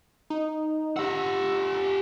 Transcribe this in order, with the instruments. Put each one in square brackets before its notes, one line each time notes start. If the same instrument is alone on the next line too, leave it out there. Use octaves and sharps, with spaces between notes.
[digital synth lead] D#4
[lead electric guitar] G4 F#5 [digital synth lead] E6